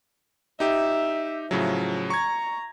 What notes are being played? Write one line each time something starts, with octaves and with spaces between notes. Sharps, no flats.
D#4 G4 E5
A2 C#3 F3 F#3
A#5 C#6 G#6